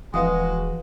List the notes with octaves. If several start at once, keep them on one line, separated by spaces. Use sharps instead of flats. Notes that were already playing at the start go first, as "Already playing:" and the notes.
D#1 F2 E3 G#3 F#4 B4 F5 D#6